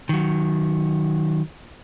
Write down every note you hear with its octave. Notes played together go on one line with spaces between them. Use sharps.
D#3 F#3